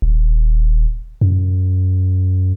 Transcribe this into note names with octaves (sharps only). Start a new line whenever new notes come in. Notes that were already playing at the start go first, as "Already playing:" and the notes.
D#1
F#2